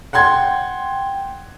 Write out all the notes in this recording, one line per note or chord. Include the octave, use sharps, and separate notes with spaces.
F#5 G5 C6 G#6